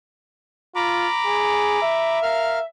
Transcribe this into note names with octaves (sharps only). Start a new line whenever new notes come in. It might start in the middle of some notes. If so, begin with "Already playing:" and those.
F4 A#5 B5 D6
G#4
E5
A#4 F5 F6